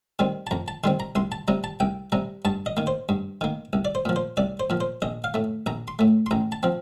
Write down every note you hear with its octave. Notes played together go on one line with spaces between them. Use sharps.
D#3 G3 C4
A5
F2 A#5
A5
D#3 G3 C4 C6
A#5
C2 C6
A5
C3 G3 A#5
A5
C2 G5
C3 G3 A#5
G2 A5
D#5
D#3 A#3
C5
G2
D#3 A#3
C2
D5
C5
A#2 F3
C5
C2 D5
C5
A#2 F3
C5
A#1 D#5
F5
A2 A3
A#1 A#5
C6
A2 A3
C6
A1 A#5
A5
F3 C4